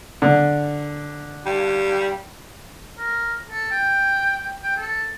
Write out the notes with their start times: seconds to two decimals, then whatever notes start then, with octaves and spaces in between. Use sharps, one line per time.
0.22 D3
1.46 G3
2.98 A#4
3.50 A4
3.71 G5
4.63 G5
4.77 A4